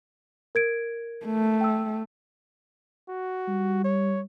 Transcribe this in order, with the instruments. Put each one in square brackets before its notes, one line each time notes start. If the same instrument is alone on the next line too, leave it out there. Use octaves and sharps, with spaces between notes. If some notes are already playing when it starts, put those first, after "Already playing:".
[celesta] A#4 G#6 D7
[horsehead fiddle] A3
[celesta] G5 E6
[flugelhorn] F#4
[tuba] G3
[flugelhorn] C#5